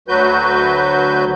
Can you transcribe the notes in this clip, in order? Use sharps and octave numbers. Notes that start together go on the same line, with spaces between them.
D2 F#3 F#4 B4 G6